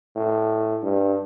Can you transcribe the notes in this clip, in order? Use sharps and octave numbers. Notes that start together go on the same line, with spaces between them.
A2
G2